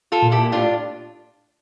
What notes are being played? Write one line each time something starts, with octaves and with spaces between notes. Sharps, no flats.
F4 A4
A#2
E4 G4
A2 D4 F4